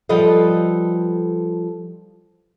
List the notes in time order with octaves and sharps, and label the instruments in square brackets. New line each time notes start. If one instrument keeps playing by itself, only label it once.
[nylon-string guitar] F3 G3 A4 B4 D#5 F5